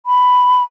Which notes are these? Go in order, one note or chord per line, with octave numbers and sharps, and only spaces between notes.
B5